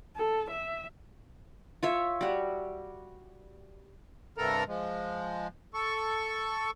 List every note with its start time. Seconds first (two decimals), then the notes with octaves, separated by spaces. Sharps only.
0.16 A4
0.50 E5
1.83 F4 C#5 E5
2.21 G3 F#4
4.38 G2 C3 B3 A4 A#4 A#5
4.68 F3 G#3
5.74 A4 C#6